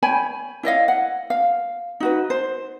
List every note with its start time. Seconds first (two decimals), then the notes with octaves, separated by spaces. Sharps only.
0.02 C#5 G5 G#5 B5
0.63 E4 C#5 D#5 F5
0.88 F#5
1.30 F5
2.00 D#4 F#4 B4
2.30 C5